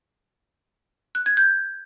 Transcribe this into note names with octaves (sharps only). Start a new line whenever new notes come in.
F#6
G#6
G6